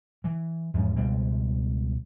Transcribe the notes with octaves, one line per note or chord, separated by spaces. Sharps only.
E3
E2 G#2 F3 C#4
C#2 B2 G3 C4